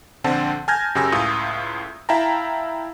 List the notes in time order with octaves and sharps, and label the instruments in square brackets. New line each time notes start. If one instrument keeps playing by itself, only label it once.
[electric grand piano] A#1 D3 C4 F#5 A5
G#5 A5 F6 G6 G#6 A#6
F#2 C#3 G4 G#5 E6 A#6
C#2 A2 F4 D#6
E4 E5 F5 G5 A5 A#5